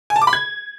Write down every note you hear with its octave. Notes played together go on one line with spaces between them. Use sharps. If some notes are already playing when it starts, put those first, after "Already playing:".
G#5
A5
D6
B5
G#6